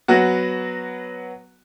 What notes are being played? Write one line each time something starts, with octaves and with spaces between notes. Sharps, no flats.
F#3 B3 F#4